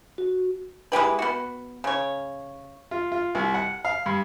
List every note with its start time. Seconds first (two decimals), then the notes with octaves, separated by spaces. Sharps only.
0.18 F#4
0.92 G#3 E4 G4 B4
1.19 B3 F#4
1.84 C#3 C#5
2.91 F4
3.12 F4
3.35 C2
3.54 F#5
3.85 F5
4.06 G2